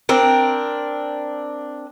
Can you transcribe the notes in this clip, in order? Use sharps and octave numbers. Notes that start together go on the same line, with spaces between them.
C4 D4 A#4